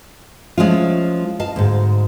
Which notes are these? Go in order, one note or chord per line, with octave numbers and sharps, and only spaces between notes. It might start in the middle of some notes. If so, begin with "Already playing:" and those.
F3 G#3 A3 C#4 E4 F4
D#5 F5 A5
D2 G#2